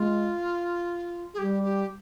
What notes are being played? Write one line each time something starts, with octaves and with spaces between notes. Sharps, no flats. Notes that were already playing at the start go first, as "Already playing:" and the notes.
Already playing: G#3 F4
G#4
G3 G4
G4